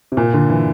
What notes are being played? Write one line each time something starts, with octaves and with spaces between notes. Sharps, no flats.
C3
A#2
D3
E3